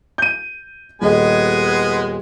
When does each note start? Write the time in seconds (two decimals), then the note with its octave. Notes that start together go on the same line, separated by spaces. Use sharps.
0.18 G6 D#7
1.02 D#1 G#3 B3 G#4 D#5 G#5